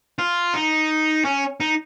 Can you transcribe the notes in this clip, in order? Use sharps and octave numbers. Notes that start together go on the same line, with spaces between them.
F4
D#4
C#4
D#4